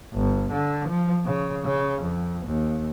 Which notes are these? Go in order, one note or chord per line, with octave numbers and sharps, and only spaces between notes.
G1
D3
F3
C#3
C#3
F2
D#2